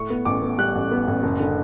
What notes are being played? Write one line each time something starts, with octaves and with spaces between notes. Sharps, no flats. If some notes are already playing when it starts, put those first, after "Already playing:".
Already playing: A2 C#6
B3
A1 D6
B3
G3 F#6
A1
B3
A1
F#1
D3